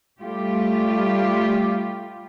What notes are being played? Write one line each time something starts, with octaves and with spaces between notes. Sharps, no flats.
G3 A3 F4 G4